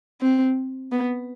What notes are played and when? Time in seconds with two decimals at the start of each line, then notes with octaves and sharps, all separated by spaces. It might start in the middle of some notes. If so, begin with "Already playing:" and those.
0.21 C4
0.92 B3